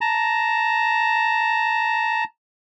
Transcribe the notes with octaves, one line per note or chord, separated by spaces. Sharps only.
A5 A#5